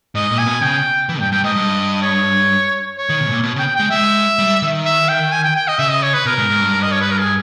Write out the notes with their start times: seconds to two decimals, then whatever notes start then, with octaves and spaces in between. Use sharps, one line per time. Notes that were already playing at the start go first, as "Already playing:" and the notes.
0.15 G#2 D#5
0.31 A#2
0.39 G#5
0.46 B2
0.62 C#3 G5
1.09 E3
1.20 G2 G5
1.32 G2 G5
1.44 G#2 D#5
1.56 G2
2.02 C#5
2.98 C#5
3.09 D#3
3.20 B2
3.27 G#2
3.32 A#2
3.43 B2
3.56 C#3 G5
3.76 G#3 G5
3.90 G#3 E5
4.39 G3
4.62 D#3
4.85 E5
5.09 G5
5.32 G#5
5.44 G5
5.56 G5
5.68 D#5
5.79 C#3 E5
5.90 D#5
6.03 C#5
6.14 B4
6.25 B2 A#4
6.38 G#2
6.50 G#2
6.61 G2
6.82 D#5
6.92 C#5
7.01 B4
7.11 A#4
7.20 G#4